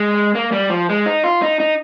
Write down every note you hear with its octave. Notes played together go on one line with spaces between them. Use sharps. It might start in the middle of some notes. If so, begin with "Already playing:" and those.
Already playing: G#3
A#3
G3
F3
G#3
D#4
F4
D#4
D#4